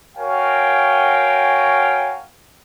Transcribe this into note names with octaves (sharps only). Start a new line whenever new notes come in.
F#4 A#4 C#5 F5 G5 G#5